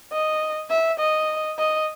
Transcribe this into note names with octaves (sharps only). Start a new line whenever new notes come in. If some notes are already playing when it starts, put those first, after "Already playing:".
D#5
E5
D#5
D#5